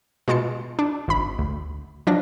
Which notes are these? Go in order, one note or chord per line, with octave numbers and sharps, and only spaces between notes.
B2 G#3 F4 A5 C#7
D4
G#1 B5
D2
F3 F#3 D4 A#6